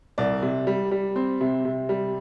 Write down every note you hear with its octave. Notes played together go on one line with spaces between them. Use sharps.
C2 D5
C3
G3
G3
C4
C3
C3
G3